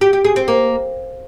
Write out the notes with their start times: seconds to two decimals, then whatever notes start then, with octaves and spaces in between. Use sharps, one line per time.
0.01 G4
0.13 G4
0.25 G#4
0.36 C4
0.48 A#3